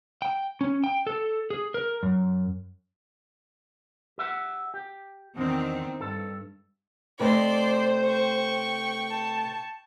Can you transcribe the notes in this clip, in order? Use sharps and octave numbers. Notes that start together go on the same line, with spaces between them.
G5
C#4
G5
A4
G#4
A#4
F#2
G4 E5 F#5
G4
E2 D#3 C4 D4
G2 A4
C3 A3 C5 D5 D#5 C6
G5 C#6
A5